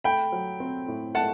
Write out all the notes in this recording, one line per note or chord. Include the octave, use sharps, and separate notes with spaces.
A3 G5 B5
F#3
C4
A2
A3 F#5 A5